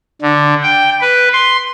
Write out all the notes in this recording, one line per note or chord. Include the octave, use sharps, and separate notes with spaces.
D3
G5
B4
C6